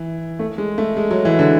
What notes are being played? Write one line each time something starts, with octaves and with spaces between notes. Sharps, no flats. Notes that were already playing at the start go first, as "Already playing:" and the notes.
Already playing: E3
A3
G#3
A3
G#3
F#3
E3
D3